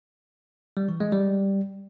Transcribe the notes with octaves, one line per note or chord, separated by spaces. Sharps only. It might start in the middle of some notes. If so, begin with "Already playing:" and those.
G3
E3
G#3
G3